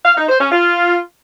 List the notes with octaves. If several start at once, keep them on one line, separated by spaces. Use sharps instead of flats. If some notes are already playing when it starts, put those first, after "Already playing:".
F5
D#4
C5
C#4
F4